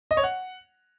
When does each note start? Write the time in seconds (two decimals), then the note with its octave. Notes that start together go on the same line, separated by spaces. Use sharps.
0.11 D#5
0.17 C#5
0.23 F#5